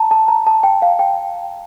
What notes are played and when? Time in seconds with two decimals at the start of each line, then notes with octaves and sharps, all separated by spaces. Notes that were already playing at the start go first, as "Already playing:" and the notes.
Already playing: A5 A#5
0.11 A5
0.28 A#5
0.47 A5
0.63 G5
0.82 F5
0.99 G5